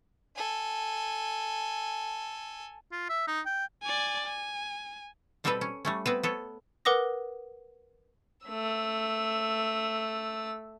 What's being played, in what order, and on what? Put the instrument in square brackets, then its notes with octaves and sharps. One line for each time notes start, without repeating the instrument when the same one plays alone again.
[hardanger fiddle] A4 G#5
[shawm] F4
E5
D#4
G5
[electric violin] D5 G#5
G#5
[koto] B2 G3 C4 G4 A4 B4
C#4
G3 A3 C#4
B3 C4 B4
B3 A4 C#5
[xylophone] A#4 B4 F#5 D6 D#6 A#6
[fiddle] A3 E6